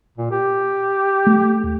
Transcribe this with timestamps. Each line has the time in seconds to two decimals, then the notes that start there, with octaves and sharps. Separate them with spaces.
0.18 A#2
0.31 G4
1.27 A3
1.64 D#2